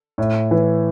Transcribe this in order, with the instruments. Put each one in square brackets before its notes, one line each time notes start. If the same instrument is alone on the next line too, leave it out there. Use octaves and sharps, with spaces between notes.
[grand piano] A2
E3